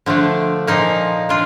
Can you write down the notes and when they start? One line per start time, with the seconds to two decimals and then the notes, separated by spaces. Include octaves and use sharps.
0.06 D3 F3 A3 D4
0.67 A#2 F3 A#3 D#4
1.29 D4 F4